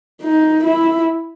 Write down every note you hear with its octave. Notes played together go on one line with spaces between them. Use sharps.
D#4
E4